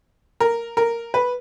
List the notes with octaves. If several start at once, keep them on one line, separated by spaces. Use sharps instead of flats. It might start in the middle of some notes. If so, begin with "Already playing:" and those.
A#4
A#4
B4